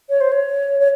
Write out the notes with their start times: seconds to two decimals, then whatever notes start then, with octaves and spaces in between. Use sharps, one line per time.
0.10 C#5
0.21 C5
0.32 C#5
0.80 C#5